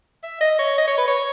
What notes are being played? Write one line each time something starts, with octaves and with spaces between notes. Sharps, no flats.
E5
D#5
C#5
D#5
C#5
B4
C#5